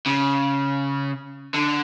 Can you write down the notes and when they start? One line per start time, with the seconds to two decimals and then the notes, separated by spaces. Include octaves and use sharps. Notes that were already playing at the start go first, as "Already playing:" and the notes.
0.06 C#3
1.55 D3